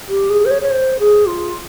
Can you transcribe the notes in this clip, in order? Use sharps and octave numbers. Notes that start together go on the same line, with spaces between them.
G4
G#4
C5
C#5
C#5
C5
G#4
F4